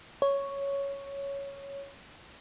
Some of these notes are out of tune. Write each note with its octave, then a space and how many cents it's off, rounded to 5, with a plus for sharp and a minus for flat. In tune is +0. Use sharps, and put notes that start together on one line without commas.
C#5 +5